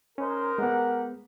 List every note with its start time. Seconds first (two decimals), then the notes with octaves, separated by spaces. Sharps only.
0.18 G#3 C#4 D#4 A#4 C5
0.58 G#3 B3 G4 F#5